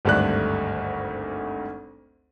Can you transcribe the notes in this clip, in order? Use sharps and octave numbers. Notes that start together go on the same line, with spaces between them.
G#1 D2 G2 A3 D5 F#6